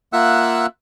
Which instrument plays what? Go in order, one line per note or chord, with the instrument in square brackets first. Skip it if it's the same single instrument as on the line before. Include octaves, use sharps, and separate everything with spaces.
[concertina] A#3 F4 E5 F#5 E6 F#6